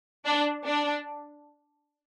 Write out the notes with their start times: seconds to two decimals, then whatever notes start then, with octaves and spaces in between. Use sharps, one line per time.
0.25 D4
0.65 D4